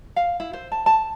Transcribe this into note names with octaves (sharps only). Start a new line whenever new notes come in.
F5
E4
C5
A5
A5